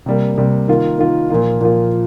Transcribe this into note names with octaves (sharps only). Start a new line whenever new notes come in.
C3 G3 A#3
C3 G3 A#3
D#3 A#3 F4
D#3 A#3 F4
A#2 F3 A#3 F4
A#2 F3 A#3 F4